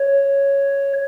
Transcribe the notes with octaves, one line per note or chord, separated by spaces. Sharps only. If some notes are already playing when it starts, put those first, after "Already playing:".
Already playing: C#5